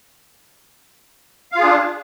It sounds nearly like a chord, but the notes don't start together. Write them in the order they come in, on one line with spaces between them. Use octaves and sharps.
F5 F4 G#4 D4